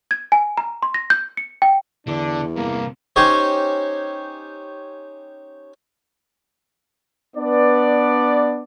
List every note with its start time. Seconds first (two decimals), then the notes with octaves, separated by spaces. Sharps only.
0.11 G#6
0.32 G#5
0.57 A#5
0.83 C6
0.94 A#6
1.10 G6
1.37 C#7
1.62 G5
2.07 E2 D3 D4
2.56 G2 C3 A#3
3.16 C#4 D#4 G4 C5 C#5
7.37 B3 D4 B4 D5